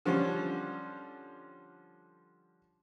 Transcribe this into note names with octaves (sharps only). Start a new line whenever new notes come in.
D3 F3 G3 C#4